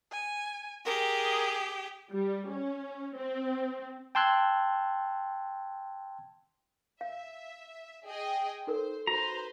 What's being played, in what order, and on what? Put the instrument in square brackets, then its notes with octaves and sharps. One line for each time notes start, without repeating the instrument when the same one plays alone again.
[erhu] G#5
[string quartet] G4 [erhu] G#4 [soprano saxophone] A#4
[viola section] G3
C#4
C4
[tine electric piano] G5 A5 C6 E6 F#6 G#6
[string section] E5 [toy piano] F5
[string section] G#4 D#5 G5
[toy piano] D#4 A4 A#4 [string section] C5
[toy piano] F#4 [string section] B4 C5 [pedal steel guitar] A#5